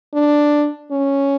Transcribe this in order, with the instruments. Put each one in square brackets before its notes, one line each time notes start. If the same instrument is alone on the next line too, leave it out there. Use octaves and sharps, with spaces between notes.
[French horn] D4
C#4